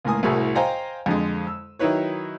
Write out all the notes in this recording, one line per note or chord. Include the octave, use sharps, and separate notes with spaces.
C#2 A2 A#3 G#5 D#6
C2 A2 E4 F#4 G#4 A#4
C5 D#5 F5 G5 G#5 A#5
F2 D3 G#3
E6
D#3 F#3 D#4 E4 B4 C#5